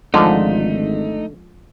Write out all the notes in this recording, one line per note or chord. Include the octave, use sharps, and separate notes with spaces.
G#1 D3 F3 G#3 A3 D#4 F4